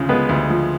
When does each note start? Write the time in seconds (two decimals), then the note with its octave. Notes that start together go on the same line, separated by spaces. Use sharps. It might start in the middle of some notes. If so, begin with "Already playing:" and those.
Already playing: D2 C#3 F3
0.09 G#3 B3 B4
0.29 D2
0.50 F3